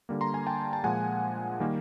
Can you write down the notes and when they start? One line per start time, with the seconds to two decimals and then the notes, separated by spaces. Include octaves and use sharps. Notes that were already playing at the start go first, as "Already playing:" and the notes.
0.09 D3 G3 A#3
0.21 A#5 C6
0.34 G#5 A#5
0.47 G5 A5
0.73 A5
0.84 A#2 F3 G#3 F#5 G#5
1.60 D#3 G3 A#3